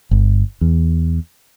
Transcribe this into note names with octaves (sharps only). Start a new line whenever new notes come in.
G1
E2